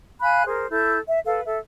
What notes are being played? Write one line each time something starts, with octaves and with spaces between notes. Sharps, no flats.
F5 G#5 B5 F#6
G#4 A#4 C5
E4 A4 G6
E5
A4 B4 F5
A4 E5